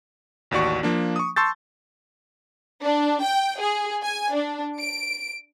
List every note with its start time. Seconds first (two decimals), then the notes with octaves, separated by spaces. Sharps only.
0.51 A1 D#2 F#4 D5 C#6
0.83 F3 A#3 D4
1.16 C#6 D#6
1.36 A5 C6 C#6 E6 G6 A6
2.82 D4
3.22 G5
3.59 G#4
4.02 G#5
4.34 D4
4.78 D7